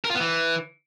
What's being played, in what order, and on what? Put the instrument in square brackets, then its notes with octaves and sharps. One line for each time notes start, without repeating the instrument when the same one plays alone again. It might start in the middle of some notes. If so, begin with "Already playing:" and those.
[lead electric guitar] A#4
F4
B3
E3